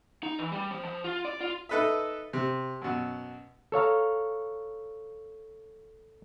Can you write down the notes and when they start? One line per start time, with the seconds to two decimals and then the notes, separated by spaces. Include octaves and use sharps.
0.23 D#4
0.39 E3
0.52 G3
0.71 F3
0.85 F3
1.04 F4
1.25 D5
1.41 F4
1.69 D#4 A4 B4 D#5 E5
2.33 C3
2.82 F#2 B2
3.72 A4 C#5 F5 A#5